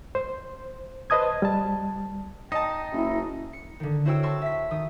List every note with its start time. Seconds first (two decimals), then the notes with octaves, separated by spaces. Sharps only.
0.15 C5
1.10 B4 C5 D#5 A5 D#6 G#6
1.42 G3 A5
2.52 D#4 D#5 G5 A5
2.93 F#1 E4
3.53 C#7
3.80 D3 D#3
4.05 E4 F#4 C5 C#5 G5 E6
4.23 A5 C6 C#6 E6 A#6
4.42 E5 B6
4.71 D#3 D#6